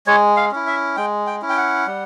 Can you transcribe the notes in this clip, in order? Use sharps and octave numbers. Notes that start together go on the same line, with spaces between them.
G#3 C#5
F5
C#4 E4
E5
G#3 G5
G5
C#4 E4
G5
F#5
G3